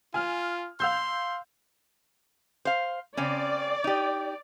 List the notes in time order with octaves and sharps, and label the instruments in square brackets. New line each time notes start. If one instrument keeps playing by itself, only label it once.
[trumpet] F4 [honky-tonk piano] G#5 F6
[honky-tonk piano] F5 E6 G6 [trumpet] C6
[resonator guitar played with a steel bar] C5 F5
[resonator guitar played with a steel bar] C#3 C4 C#4 [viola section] D5
[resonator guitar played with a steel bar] D#4 G4